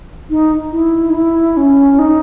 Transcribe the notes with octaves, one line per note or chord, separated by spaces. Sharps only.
D#4
E4
D#4
E4
C#4
D#4